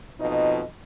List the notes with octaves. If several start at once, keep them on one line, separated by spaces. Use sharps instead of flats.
F2 B2 D#4 F4 D#5